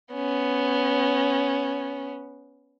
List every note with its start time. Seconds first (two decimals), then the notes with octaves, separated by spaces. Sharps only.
0.14 B3 C#4